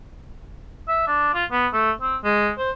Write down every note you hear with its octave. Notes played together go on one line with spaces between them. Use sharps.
E5
D4
F4
B3
A3
C4
G#3
C5